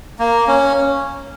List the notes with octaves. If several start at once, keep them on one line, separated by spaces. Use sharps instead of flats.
A#3
C#4